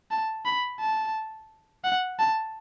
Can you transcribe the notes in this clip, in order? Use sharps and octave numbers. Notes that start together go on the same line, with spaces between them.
A5
B5
A5
F#5
A5